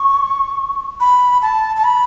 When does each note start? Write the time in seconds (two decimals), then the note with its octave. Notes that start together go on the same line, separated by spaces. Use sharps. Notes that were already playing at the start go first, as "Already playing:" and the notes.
Already playing: C#6
1.00 B5
1.42 A5
1.76 A5
1.84 B5